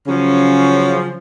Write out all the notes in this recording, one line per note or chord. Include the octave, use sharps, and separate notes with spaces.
C#3 F3 F#3 C#4